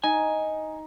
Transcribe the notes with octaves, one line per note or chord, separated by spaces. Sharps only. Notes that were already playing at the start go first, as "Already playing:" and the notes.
D#4 G#5